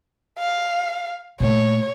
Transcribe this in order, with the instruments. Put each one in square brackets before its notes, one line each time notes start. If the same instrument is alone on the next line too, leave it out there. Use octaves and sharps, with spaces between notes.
[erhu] F5
[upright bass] A#2 A3 [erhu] C#5